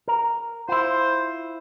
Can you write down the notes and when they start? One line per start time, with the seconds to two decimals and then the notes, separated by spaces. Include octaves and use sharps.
0.08 A#4
0.69 E4 F4 C5